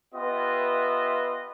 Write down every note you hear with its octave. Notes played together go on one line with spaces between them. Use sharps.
B3 F4 G4 B4 D#5 E5